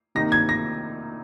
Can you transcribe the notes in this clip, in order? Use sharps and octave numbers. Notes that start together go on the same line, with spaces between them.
C3 D#3 A#3 D#4 A#6
G#6
A#6